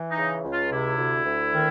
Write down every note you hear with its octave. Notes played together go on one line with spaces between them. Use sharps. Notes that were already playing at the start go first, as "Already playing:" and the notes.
Already playing: E3
D#4
C#3
C#2
F4
C3 E4
D2
D2
D#3